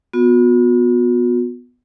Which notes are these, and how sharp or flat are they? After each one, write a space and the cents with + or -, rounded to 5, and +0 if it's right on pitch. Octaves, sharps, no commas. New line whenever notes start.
B3 +0 F#4 -45